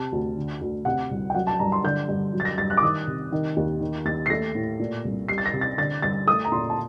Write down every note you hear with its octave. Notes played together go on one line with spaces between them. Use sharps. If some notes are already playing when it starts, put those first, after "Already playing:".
Already playing: C3 A5
D2
D3
D2
C3 F#5
C2
G5
F#3 F#5
A5
G2 A#5
C6
D3 G6
G2
F#3
A6
A#6
G2 A6
F#6
D6
D#3 D#6
C3
D#3
D#2
D#3
D#2 A6
C7
A3 A#6
A2
A#2
C2
G3 C7
A6
A#6
C3
A6
D3 A6
G2 A6
A3 D#6
A#5
A#2 C6
A5